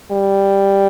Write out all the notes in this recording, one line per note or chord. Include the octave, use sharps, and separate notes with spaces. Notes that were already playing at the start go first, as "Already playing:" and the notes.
G3